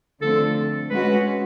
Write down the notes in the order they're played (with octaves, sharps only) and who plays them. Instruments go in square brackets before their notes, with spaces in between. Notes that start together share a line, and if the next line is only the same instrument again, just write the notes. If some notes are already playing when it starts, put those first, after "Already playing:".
[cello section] D3 F3 A3 C4 [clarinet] A4
[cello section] G#3 C#4 F#4 [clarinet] B4